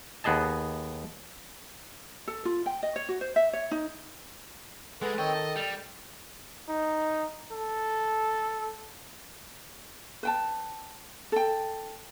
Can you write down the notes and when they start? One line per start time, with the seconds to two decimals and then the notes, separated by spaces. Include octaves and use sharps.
0.24 D#2 B3 G#4 D#5 A5
2.28 A4
2.45 F4
2.66 G5
2.83 D#5
2.96 C#5
3.09 F#4
3.21 C5
3.36 E5
3.53 C#5
3.71 D#4
5.02 G#3 G#4 A4 B4 F#5
5.18 D#3 C4 C#5 D#5 G5
5.35 A5
5.56 G3 G5
6.69 D#4
7.52 A4
10.23 B4 G5 A5
11.32 A4 G5